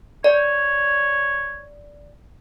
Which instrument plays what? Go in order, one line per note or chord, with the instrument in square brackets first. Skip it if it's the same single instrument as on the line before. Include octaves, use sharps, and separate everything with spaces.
[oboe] C#5 [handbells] D5